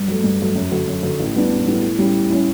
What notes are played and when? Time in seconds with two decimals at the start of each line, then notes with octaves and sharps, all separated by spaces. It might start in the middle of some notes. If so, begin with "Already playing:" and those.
Already playing: G2
0.08 F#3 A3
0.24 G2
0.40 F#3 A3
0.56 F#2
0.72 D3 F#3
0.88 F#2
1.03 D3 F#3
1.19 A1
1.35 A2 G3 B3 D4
1.51 A1
1.67 A2 G3 B3 D4
1.82 A2
1.99 G3 C#4 E4
2.14 A2
2.30 G3 C#4 E4